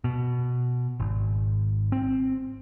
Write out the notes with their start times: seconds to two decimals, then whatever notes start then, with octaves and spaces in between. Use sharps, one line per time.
0.04 B2
1.00 G#1
1.92 C4